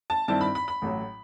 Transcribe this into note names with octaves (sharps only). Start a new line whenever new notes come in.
A5
G2 D#3 G3 C4 E4 A5
B5
B5
B5
A1 A2 F#3